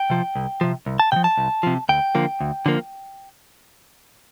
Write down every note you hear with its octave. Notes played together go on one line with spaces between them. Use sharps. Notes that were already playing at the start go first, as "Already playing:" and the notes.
Already playing: G5
C3 F3
C2
C3 F3
C2
A5
C3 F3 G5
A5
C2
C3 F3
D2 G5
D3 F3 A#3
D2
D3 F3 A#3